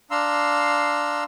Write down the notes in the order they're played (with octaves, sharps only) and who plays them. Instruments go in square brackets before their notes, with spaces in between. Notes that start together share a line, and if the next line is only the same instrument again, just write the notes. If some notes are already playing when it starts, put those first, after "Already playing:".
[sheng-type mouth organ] D4 F5 A#5 C6 E6